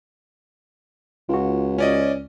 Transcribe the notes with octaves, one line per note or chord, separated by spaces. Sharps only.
C#2 F4 F#4
C#4 D5 D#5